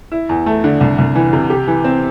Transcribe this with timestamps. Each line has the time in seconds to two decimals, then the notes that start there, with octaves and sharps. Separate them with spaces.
0.12 E4
0.29 E2
0.46 A3
0.64 D3
0.81 C2
0.98 C2
1.15 E3
1.33 C3
1.50 G4
1.67 E3
1.84 C4